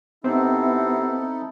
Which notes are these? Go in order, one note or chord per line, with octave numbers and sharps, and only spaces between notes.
C3 B3 C4 D#4 E4 A4